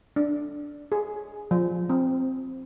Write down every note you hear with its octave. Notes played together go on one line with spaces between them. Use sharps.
D4
G#4
F3
C4